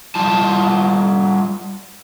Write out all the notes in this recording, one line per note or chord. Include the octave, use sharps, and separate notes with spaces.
G3 F4 A5